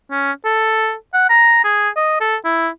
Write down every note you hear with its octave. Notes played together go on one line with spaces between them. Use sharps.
C#4
A4
F#5
A#5
G#4
D#5
A4
E4